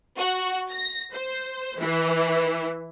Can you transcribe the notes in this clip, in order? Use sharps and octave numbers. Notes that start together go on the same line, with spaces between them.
F#4
A#6
C5
E3